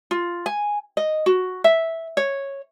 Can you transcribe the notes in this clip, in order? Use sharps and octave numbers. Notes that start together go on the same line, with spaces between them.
F4
G#5
D#5
F#4
E5
C#5